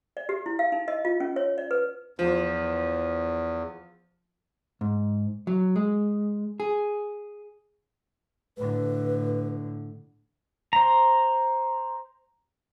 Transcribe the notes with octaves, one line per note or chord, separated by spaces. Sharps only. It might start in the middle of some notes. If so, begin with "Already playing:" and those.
D5
G4
E4
F5
D#4
D#5
F4
C#4
C#5
D5
B4
E2 F3
G#2
F#3
G#3
G#4
A2 D3 B4
C5 A#5